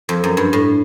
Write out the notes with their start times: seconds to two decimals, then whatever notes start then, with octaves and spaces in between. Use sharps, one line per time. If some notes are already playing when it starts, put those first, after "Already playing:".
0.09 F2
0.24 F#2
0.37 G2
0.53 A2